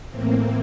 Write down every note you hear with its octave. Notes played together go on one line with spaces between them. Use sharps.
A2 E3 A#3 C4